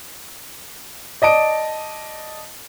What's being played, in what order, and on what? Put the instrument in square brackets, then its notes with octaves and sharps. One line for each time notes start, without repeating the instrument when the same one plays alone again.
[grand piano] D5 D#5 A5 D7